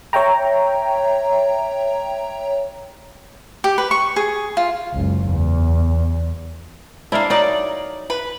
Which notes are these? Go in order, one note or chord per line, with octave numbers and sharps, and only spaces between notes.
C#5 E5 G5 A#5
G4
B4
C#6
G#4
F4
F#1 C#2
E2
A#3 D4 E4 D5 F5
F#3 D#4 A#4 D5
B4